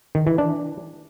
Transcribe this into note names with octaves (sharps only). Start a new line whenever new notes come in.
D#3
E3
D4